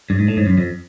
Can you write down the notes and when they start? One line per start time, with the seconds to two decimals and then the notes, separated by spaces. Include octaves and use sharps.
0.10 G2
0.19 G#2
0.28 A2
0.37 G#2
0.46 F#2
0.58 F2